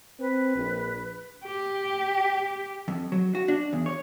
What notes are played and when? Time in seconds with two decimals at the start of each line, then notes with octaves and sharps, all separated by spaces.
0.20 C4 B4
0.56 A#1
1.44 G4
2.88 F2
3.12 F#3
3.35 F#4
3.48 D4
3.73 E2
3.86 C#5